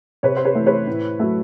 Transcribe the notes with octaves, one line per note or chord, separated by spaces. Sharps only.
C3 B4 C#5
C5
B4 C#5
E3 A3
B4 C#5
A2
F#3 A3